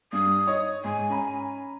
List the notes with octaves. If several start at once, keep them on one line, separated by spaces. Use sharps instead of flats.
G2 D#6
D#4 C#5 D#5
G#2 G#5
C#4 A#5 B5